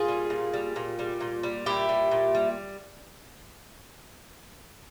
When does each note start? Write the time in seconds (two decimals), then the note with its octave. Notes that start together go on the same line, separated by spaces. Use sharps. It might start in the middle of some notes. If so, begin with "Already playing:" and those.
Already playing: A#2 F4 G#4
0.08 G3
0.30 A#2
0.53 G3
0.76 A#2
0.99 G3
1.21 A#2
1.43 G3
1.66 A#2 E4 G4
1.89 G3
2.11 A#2
2.35 G3